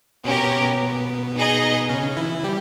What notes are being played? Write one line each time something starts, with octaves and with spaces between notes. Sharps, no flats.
B2 B3 C#4 G4 A#4
B2 B3
B2 B3
D#4 G#4 D#5
C#3 C#4
E3 E4
G3 G4